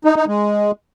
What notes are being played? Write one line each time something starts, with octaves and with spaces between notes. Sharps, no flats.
D#4
D#4
G#3